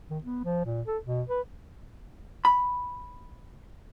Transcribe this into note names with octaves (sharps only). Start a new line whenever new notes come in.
D#3
B3
F3
A#2
A4
B2
B4
B5